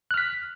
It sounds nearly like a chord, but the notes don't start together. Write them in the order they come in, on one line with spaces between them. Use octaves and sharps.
F#6 F6 B6